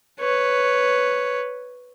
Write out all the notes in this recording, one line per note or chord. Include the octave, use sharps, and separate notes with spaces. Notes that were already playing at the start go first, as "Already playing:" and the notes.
B4 C#5